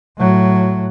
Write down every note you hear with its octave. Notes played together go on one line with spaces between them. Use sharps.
A2 F#3